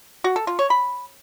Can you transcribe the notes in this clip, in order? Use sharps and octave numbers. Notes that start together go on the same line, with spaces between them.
F#4
A4
F4
C#5
B5